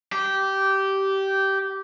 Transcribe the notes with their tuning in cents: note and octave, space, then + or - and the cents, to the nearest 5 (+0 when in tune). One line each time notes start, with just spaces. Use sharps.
G4 -15